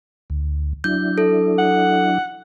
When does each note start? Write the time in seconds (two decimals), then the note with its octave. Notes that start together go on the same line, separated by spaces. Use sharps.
0.30 D2
0.84 F#3 D4 E4 G6
1.18 A4
1.58 F#5